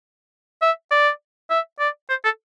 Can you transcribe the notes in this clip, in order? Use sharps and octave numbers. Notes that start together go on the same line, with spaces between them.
E5
D5
E5
D5
C5
A4